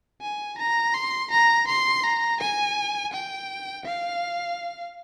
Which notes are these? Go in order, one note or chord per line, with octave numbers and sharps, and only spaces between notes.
G#5
A#5
C6
A#5
C6
A#5
G#5
G5
F5